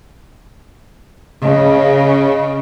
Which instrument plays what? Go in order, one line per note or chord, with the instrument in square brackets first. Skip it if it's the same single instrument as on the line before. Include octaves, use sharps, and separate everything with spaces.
[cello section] C#3 [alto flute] D#5